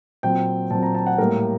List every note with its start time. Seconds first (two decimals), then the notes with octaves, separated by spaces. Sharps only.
0.23 A#2 F#3 C4 G5
0.71 A#2 F#3 C4 A5
0.83 A#5
0.94 A5
1.07 F#5
1.18 A2 G3 A#3 A#4